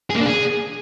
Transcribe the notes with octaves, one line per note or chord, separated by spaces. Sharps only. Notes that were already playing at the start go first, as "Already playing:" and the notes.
G#4
A#3
D4
G#4